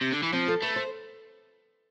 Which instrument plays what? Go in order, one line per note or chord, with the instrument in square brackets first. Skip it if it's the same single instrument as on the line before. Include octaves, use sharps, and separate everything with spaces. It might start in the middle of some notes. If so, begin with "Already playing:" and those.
[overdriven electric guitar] C3
D3
E3
[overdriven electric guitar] F3 [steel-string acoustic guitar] C4
[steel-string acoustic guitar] A4
[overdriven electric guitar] A3 [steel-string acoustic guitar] B4
[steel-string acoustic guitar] C5